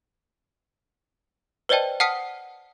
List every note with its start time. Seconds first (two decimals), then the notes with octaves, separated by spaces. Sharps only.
1.69 B4 C5 D5 D#5 G5 A5
2.00 F#5 A5 D#6 F6 B6 C#7